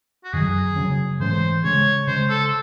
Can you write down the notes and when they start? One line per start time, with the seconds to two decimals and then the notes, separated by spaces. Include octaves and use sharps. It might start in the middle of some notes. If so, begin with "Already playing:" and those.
0.24 F#4
0.33 F#2 D#3 F#3 G#4
0.76 C#3 F#3 C#4
1.20 G#2 E3 A3 C#4 C5
1.64 C#3 G#3 C#4 C#5
2.07 C#3 G#3 C#4 C5
2.29 A4